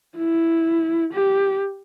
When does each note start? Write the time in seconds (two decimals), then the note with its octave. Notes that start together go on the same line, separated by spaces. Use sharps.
0.17 E4
1.13 G4